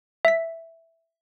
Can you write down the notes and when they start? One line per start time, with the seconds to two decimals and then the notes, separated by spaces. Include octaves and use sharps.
0.25 E5 B6